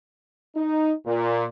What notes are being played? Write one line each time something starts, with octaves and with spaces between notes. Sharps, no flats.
D#4
A#2